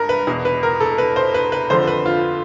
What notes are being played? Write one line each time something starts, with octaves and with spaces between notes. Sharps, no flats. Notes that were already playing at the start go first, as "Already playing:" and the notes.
Already playing: G2 A#4
B4
E2 B2
B4
A#4
A4
B4
C5
B4
B4
F2 D3 F3 C5
B4
F4